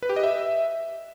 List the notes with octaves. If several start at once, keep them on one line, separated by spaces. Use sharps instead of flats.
B4
G4
D#5
E5